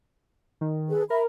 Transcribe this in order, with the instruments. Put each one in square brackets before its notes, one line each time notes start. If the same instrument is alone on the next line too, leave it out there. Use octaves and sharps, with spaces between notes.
[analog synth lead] D#3
[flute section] G#4 A4 B4
[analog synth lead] A#4 [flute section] E5 B5